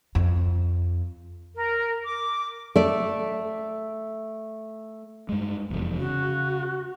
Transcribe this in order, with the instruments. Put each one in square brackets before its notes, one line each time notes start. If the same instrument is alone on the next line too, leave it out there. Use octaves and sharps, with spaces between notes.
[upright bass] F2
[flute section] A#4
D6
[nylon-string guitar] A3 D5
[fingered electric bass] G2 G#3
F1 E2
[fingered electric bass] C#3 [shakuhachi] F#4